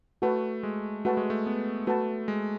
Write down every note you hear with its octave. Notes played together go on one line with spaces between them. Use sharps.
A3 F#4 B4 F#5 A5
G#3
A3 F#4 B4 F#5 A5
G#3
A3
B3
A3 F#4 B4 F#5 A5
G#3